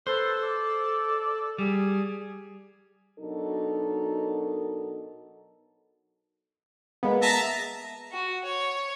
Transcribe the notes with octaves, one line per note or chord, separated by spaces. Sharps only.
A4 B4 C5
D5
G3 G#4
B2 F#3 D4 D#4 A4 A#4
G#3 A#3 B3
E5 A5 A#5 D#6
F#4
C#5